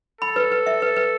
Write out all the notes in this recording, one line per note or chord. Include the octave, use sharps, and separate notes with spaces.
A4 B5
B4
B4
E5
B4
B4